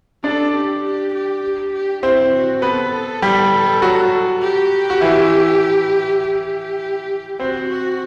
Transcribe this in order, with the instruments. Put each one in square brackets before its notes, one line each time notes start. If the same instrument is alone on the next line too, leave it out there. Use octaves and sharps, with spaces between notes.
[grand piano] D4 D5 [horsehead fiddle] A4
[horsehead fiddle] G4
G4
G4
G4
G4
[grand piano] C4 C5 [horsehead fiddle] E4
[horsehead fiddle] F#4
[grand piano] B3 B4 [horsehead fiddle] A4
[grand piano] G3 G4
F#3 F#4
[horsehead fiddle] G4
[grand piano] F#4
E3 E4
[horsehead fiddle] G4
[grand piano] C4 C5 [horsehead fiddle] F#4
[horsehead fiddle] F#4